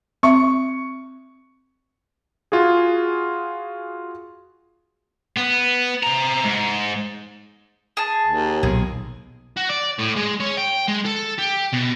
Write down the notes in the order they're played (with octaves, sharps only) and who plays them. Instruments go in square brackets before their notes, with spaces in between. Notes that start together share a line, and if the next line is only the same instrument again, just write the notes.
[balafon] C4 E5 [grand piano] C#6
[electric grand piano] F4 F#4 G#4
[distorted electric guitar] B3
C3 A#5
G#2
[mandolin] G#4 A5
[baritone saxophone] D#2
[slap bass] B1 A#2 [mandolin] G#4
[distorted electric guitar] F#4
D5
A2
G#3
C#4
G5
G#3
A4
G4
B2